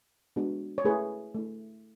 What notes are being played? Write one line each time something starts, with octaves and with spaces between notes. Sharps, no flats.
G#3 B3 D4 F#4
C#5
A3 E4 G#4 B4
A3 E4